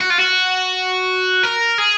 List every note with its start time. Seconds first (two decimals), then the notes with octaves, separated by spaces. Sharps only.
0.01 F#4
0.10 F4
0.19 F#4
1.43 A#4
1.78 G#4